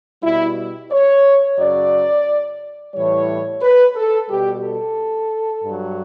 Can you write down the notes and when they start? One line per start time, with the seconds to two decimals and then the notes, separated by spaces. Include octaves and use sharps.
0.23 B2 G3 E4
0.92 C#5
1.58 F#2 C#3 F#3 D5
2.94 A2 E3 G3 C#5
3.61 B4
3.96 A4
4.29 B2 G3 G4
4.64 A4
5.64 G2 F#3